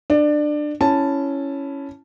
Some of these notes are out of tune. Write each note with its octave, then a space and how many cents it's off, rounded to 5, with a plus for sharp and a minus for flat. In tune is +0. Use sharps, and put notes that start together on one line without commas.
D4 +20 D5 +20
C#4 +0 E4 +5 A5 +0